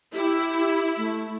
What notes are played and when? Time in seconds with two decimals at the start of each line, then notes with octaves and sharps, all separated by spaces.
0.14 E4 G4
0.97 A3